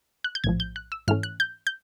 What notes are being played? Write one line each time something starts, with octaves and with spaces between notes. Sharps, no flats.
F#6
G6
A#1 A2 F3 G#6
G6
F#6
E6
G#2 E3 A3 C#4 F6
F#6
G6
G6